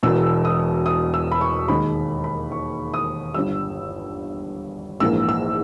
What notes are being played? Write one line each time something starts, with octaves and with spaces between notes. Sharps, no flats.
E1 E2 B2 E6
D#6
D#6
E6
B5
C#6
D#2 D#3 G#3 B5
B5
C#6
D#6
G1 G2 G3 E6
A#1 G#2 E3 A#3 E6
E6